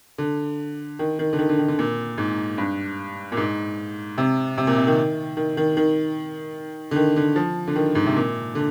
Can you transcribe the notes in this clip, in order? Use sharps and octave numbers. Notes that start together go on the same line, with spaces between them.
D3
D#3
D#3
D3
D#3
D3
D#3
D3
A#2
G#2
G2
A#2
G#2
C3
C3
A#2
C3
D#3
D#3
D#3
D#3
D3
D#3
D3
F3
D3
D#3
G#2
C3
A#2
D3